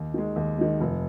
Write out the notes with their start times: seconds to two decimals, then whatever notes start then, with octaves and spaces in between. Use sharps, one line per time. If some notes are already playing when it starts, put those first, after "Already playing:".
Already playing: D#2
0.14 D#3 G#3
0.36 D#2
0.58 D#3 G#3
0.80 F1